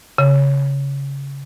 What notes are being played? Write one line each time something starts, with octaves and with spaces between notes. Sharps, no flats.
C#3